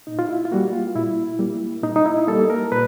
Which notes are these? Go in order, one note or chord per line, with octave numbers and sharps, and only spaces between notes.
A#2 D#4
F4
E4
F4
G3 A#3 F#4
F4
A#2 E4
G3 A#3
A#2 D#4
D#4
E4
G3 A#3 A4
A#4
A#2 B4